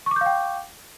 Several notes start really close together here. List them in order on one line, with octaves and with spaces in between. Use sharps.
C#6 D6 G6 F5 G5